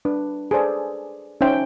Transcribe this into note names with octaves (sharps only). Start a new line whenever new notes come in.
D4 B4
G#4 A4 B4 C5 D5 G#5
C#4 D#4 C5 E5 G5